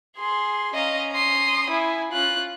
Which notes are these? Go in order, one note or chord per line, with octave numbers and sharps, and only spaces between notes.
G#4 C6
C#4 D#5 F5 A#5
C6 D#6
E4 G#5
C#4 F4 F#6